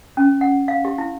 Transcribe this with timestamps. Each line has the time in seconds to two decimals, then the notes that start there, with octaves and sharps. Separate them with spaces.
0.17 C#4
0.41 F#5
0.68 F5
0.85 G4
0.98 E4